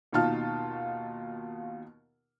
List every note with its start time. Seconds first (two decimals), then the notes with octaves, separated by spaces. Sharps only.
0.12 D#2 B2 D#4 F4 A5 F6